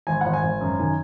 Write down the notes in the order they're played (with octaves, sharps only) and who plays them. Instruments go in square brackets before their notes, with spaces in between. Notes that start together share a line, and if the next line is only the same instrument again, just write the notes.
[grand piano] G#1 G#5
G#1 F#5
G#5
G#1
F#2
D#3 G#5